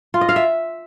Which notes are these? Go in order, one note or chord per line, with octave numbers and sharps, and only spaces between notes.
F4
D#5
F5
E5